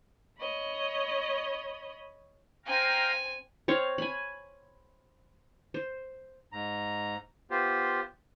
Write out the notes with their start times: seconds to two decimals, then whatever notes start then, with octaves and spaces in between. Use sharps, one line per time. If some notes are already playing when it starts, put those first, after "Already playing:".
0.38 C#5 D#5 B5
2.66 C4 F5 G5 G#5 A#5
3.68 C4 C#5 F5
3.98 G#5 B5
5.74 C5
6.52 G#2 A#5
7.51 B3 F4 G4 C5